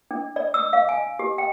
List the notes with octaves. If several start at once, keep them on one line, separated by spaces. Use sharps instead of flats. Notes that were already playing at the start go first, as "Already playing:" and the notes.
D4
D5
E6
F5
G#5
G4
G5